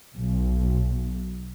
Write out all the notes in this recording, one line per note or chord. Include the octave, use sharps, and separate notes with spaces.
B1